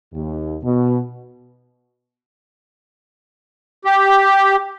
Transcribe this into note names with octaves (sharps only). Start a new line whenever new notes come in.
D#2
B2
G4